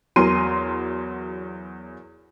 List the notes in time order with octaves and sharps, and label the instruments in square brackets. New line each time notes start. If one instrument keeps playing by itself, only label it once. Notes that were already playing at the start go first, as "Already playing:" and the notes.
[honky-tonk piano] E2 F#3 A#4 C6 D#7